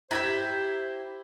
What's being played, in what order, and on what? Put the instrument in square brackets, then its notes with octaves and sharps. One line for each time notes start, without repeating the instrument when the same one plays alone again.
[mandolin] E4 E5 G5 [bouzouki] G4 [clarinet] C5 [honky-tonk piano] A#5 G#6 B6